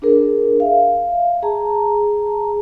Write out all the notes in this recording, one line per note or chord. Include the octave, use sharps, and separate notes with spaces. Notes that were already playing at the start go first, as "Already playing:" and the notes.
D4 G#4 A#4
E5 F5
G#4 A5 A#5